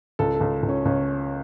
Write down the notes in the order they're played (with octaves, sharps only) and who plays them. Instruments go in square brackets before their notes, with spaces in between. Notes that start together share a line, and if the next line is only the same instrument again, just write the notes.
[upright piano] C#2 A4
A4
C#2
C#2
C#4
C#2 C#4